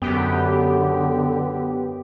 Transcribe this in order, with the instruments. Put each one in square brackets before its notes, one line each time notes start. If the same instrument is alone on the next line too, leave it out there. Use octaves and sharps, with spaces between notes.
[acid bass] F#2 [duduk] D3 [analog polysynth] B3 G4